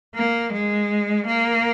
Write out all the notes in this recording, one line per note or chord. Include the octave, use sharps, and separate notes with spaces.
A#3
G#3
A#3